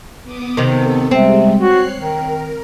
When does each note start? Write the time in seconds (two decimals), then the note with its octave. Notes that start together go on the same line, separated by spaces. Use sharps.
0.24 B3 D6 D#6
0.57 C3 D#3 B3 A4
1.11 C3 G3 G#3 C4
1.59 F#4 C#5 F#6 C7
1.98 D#3 A#4